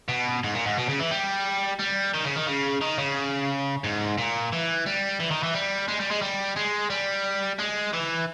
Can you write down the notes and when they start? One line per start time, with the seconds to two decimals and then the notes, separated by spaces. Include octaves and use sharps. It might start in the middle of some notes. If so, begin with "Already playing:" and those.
0.08 B2
0.44 G#2
0.54 A#2
0.66 G#2
0.78 B2
0.89 C#3
1.00 E3
1.11 G3
1.79 G3
2.14 D#3
2.25 C#3
2.36 D#3
2.47 C#3
2.82 D#3
2.98 C#3
3.84 G#2
4.18 A#2
4.53 E3
4.86 G3
5.20 E3
5.31 D#3
5.43 E3
5.54 G3
5.88 G#3
6.00 G3
6.11 G#3
6.22 G3
6.56 G#3
6.90 G3
7.59 G#3
7.93 E3